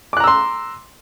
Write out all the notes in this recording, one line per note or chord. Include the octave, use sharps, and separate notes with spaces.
A#5 C6 D6 E6 F#6